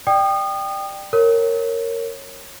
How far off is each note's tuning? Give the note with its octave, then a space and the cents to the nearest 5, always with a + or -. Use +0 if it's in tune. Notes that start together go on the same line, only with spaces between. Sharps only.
D5 +20 G5 +0 D#6 -30
A#4 -15 C#5 -15